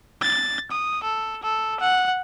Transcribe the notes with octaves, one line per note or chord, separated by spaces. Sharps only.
A6
D#6
A4
A4
F#5